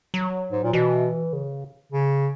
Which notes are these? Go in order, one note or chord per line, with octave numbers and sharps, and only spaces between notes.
F#3
G#2
A#2
B2 E3
C#3
C#3